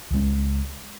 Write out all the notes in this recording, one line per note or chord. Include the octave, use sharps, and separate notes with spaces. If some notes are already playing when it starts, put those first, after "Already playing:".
C#2 C#3 G#3 C#4